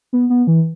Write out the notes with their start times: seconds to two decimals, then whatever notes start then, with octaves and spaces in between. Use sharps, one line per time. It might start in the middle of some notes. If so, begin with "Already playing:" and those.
0.13 B3
0.30 B3
0.47 E3